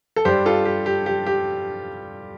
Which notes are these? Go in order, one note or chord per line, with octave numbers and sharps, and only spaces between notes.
A4
G2 G3 D4 G4 C5
F4 A4
G4
G4
G4
G4